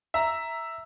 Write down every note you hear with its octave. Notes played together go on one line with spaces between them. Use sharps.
E5 A#5